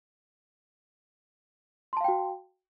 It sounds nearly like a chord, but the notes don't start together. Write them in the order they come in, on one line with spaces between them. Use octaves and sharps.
C6 A5 F5 G5 F#4